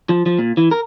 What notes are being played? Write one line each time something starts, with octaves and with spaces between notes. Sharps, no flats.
F3
F3
A#2
E3
A#4